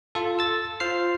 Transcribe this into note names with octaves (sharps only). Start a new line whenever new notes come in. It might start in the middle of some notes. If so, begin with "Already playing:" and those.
F4 A4
E6 A6
F4 C5 F6 C7